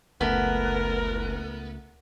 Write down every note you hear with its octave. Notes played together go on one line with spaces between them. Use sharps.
F#1 C#2 A3 B3 A#4